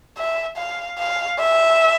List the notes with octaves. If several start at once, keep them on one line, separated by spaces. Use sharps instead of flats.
E5
F5
F5
E5